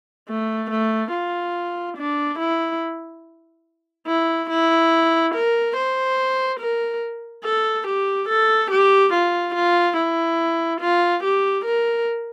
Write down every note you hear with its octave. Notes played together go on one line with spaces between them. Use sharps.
A3
A3
F4
D4
E4
E4
E4
A#4
C5
A#4
A4
G4
A4
G4
F4
F4
E4
F4
G4
A#4